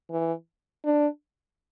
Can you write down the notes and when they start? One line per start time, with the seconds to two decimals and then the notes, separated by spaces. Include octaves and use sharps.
0.10 E3
0.84 D4